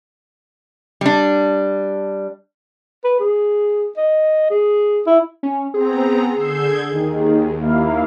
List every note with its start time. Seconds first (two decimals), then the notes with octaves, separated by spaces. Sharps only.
1.01 G3 D4
3.04 B4
3.20 G#4
3.97 D#5
4.50 G#4
5.07 E4
5.43 C#4
5.74 B3 C4 G#4 A#5
6.35 D3 E6 G6 G#6 C7
6.91 D#2 D#3
7.60 A#3 E4 F5